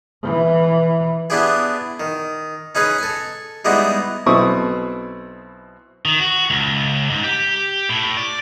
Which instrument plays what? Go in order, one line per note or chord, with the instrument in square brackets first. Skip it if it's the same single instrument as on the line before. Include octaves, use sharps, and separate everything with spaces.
[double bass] E3
[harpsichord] B3 D4 E4 G4 G#4
D#3
C#4 D#4 G#4 B4 C#5
A4 G#5
G3 G#3 B3 D#4 E4 F#4
[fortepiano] B1 B2 C4 E4 C#6 D#6
[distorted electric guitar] D#3
F#4
C#2
G#2
G4
A2
D5